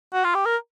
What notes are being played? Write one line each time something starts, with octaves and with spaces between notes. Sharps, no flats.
F#4
F4
G4
A#4